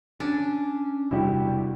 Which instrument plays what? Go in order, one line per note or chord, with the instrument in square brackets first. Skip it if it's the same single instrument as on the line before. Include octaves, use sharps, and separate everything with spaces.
[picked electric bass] C#4 [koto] D4
[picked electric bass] E1 C3 G3 [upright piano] E4 F#4 G4